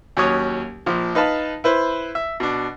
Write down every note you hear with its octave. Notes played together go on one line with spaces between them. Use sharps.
D#2 F#3 C#4 C#5 D#6
A#1 F3
D#4 B4 F5 A5 B5
E4 B4 C5
E5
B2 D4